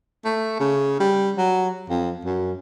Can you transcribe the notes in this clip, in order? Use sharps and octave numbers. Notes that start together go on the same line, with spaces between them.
A3
C#3
G3
F#3
F2
F#2